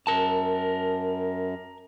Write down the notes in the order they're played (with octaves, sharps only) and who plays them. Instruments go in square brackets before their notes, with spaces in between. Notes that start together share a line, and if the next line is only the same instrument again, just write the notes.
[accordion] F#2 [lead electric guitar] A#4 A5